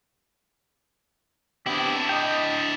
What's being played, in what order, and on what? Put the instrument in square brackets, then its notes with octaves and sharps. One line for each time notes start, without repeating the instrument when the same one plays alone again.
[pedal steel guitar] B3 C4 G4 [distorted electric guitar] D4 E4
[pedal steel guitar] D#5 G5